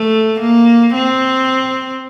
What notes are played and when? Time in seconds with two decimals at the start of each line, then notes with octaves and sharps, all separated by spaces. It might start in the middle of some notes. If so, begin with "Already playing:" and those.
Already playing: A3
0.40 A#3
0.94 C4